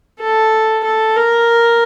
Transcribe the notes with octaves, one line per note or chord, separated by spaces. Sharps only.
A4
A4
A#4